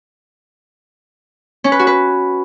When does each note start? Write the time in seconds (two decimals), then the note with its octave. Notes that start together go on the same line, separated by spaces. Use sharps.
1.64 C#4
1.72 B4
1.79 F#4
1.87 B4